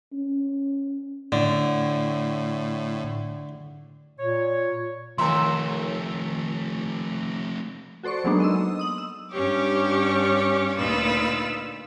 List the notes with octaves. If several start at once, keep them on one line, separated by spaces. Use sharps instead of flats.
C#4
A2 D3
A#2 C#5
D#2 F3 A3 E5 A#5 C6
F#4 A4 C5 D5 C#6
F#3 G#3 A#3 B3 D4 D#4
D#5 C6 E6
D#6 F#7
E6
G2 C#4 G4 C#5 D6
D2 A#2 D#4 F4 B4 E6